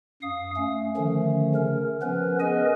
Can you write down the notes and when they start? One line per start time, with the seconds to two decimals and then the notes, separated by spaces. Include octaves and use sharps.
0.22 F#2 F5 D#6
0.56 A3 C#4
0.96 D3 D#3 F3 A3 C#4
1.55 C#3 A#4
2.02 F3 B3 C#4 A#4 B4
2.40 G#4 A#4 B4 D#5 G#5